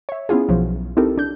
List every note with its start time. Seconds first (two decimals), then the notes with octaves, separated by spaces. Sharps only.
0.09 C#5 E5
0.29 B3 C#4 E4 F4 G#4
0.49 B1 F3 F#3
0.97 C4 D#4 E4 G4 A4 A#4
1.17 D4 G6